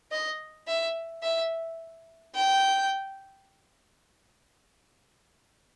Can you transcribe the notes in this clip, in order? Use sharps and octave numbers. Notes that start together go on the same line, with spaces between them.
D#5
E5
E5
G5